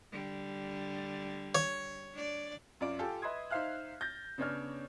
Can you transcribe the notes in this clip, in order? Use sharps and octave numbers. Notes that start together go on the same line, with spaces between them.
D3 G3
C#5
D4 D5
F#2 F4 D5 D7
F4 G4 A4 G#5
B4 D#5 E5 C6 D#6 G#6
D#4 C5 E5 F5 F6 F#6
G6 A6 A#6
C#3 B3 D4 C#5 D5 F6